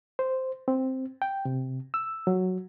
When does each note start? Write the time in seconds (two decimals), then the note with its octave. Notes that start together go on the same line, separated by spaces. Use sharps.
0.19 C5
0.68 C4
1.22 G5
1.45 C3
1.94 E6
2.27 F#3